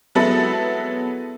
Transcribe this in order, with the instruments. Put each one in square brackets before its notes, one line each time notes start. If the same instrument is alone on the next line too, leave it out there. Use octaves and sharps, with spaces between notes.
[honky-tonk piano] F#3 G#3 B3 E4 A4 B5